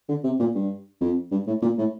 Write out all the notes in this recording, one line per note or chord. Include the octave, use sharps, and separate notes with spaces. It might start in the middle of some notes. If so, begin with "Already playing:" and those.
D3
C3
A#2
G2
F2
G2
A2
A#2
A2